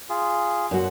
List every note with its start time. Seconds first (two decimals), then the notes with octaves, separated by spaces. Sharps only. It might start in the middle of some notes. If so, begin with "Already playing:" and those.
0.09 F4 G#4
0.71 F#2 F#4